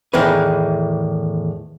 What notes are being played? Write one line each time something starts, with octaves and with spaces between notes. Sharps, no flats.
E2 A2 D#3 E3 B4